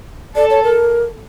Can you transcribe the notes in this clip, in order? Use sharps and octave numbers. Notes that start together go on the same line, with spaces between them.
A4 D5
C#5
A#4